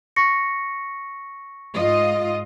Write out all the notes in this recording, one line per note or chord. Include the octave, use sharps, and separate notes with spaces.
C#6 A#6 C#7
G#2 F4 D#5